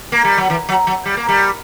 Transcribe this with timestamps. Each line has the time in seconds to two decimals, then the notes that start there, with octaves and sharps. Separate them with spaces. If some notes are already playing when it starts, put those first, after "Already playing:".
0.12 A#3
0.24 G3
0.37 F#3
0.50 E3
0.69 F#3
0.87 F#3
1.06 G3
1.17 A#3
1.29 G3